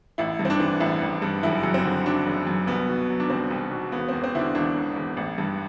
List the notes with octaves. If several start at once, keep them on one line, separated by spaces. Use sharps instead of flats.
A1 E4
G2
C4
D4
E3
A1 E4
A1
G2
F#1 E4
F#2
C4
D3
F#3 D4
F#1
F#2
C2 B3
B2
F#3
D4
C2 C4
C2
B2
E1 B3
E2 C4
C4
D3 D4 E4
E1 D4
E1
E2
A1
G2